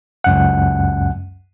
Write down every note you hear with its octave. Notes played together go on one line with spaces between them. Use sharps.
C#2 F#2 F#5